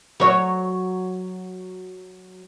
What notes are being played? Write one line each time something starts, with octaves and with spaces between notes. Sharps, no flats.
F#3 C#5